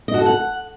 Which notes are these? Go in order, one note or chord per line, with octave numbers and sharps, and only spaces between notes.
D#5
F#4
A4
F#5